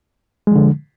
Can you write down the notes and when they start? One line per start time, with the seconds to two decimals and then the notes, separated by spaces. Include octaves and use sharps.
0.47 G#3
0.51 F3
0.56 D3